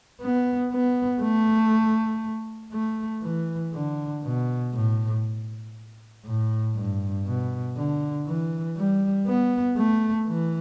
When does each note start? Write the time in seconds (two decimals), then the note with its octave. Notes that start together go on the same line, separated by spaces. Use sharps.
0.21 B3
0.72 B3
1.22 A3
2.73 A3
3.23 E3
3.74 D3
4.24 B2
4.74 A2
6.25 A2
6.75 G2
7.25 B2
7.77 D3
8.27 E3
8.77 G3
9.27 B3
9.78 A3
10.28 E3